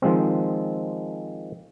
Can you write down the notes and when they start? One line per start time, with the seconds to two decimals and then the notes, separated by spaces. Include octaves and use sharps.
0.02 D#3 F3 G#3 C4